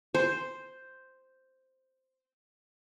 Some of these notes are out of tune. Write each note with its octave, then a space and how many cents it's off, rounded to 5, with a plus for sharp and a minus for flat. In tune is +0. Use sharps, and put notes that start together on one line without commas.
C5 +0